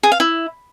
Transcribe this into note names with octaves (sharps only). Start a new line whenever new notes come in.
G#4
F5
E4